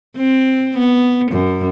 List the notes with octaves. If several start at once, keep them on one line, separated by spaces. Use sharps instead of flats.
C4
B3
F#2